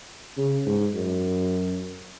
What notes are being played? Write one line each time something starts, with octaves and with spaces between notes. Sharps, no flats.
C#3
G#2
F#2